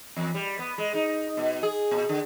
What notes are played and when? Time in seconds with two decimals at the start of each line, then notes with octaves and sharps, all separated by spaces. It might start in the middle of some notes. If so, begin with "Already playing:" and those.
0.16 E2
0.35 G3
0.59 B3
0.78 G#3
0.94 D#4
1.37 B2
1.63 G#4
1.91 A#2
2.09 D3